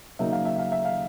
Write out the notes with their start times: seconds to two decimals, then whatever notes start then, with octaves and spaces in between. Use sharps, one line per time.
0.19 C#3 F#3 A#3 D#4 E5
0.32 F5
0.45 E5
0.59 F5
0.72 E5
0.85 F5